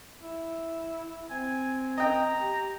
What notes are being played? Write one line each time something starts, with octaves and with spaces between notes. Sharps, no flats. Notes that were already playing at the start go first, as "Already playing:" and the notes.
E4
C4 G#5
D#5 G5 A#5
G4